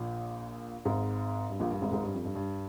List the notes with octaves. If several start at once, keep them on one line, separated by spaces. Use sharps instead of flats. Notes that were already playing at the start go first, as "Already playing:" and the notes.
Already playing: A#1 A#2
G#1 G#2
G2
A#1 A#2
G2
G#1 G#2
G#1 G#2
G2
F2
G2
G2